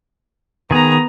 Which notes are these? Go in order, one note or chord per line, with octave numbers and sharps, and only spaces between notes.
D#3 B3 G#4 A#5